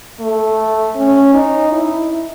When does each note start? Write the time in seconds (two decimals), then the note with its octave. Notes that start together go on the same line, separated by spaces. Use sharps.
0.20 A3
0.96 C#4
1.34 D#4
1.72 E4